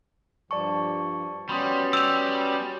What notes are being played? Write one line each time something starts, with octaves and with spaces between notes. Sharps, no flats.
G2 F3 G3 D5 A5 C#6
G3 B3 C#4 F#4 B5 C6 D#6
G3 E6 F7